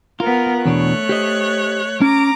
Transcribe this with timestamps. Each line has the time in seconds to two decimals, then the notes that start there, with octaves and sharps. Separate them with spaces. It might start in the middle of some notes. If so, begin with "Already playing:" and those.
0.20 B3 F4 A#4
0.66 E2 B2 A3 D4 C#5 F#6
1.09 G4 C5 D#5
2.01 C#4 A#5 D6